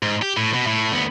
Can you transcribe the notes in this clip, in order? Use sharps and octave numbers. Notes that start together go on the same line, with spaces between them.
G#2
G4
A2
B2
A2
D2 B3